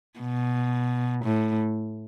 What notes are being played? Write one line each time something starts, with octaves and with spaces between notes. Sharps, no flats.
B2
A2